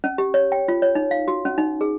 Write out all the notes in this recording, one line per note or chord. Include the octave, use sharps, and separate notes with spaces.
C#4
G4
C#5
G5
F4
C#5
D#4
F5
F#4
C#4
D#4
G#4